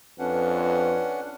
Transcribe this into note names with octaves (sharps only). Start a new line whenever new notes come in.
F2 C#4 D4 B4 F#5